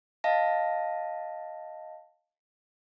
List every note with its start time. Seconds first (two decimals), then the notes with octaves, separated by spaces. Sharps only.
0.24 D#5 F5 A5 A#6